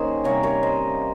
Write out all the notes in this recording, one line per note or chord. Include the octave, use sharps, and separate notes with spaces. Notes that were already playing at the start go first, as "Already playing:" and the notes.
Already playing: D#3 A#3 C#4 G#4 C5
C3 G3 A#3 C#4 A#4 C#5
A#4 C#5
C5 D#5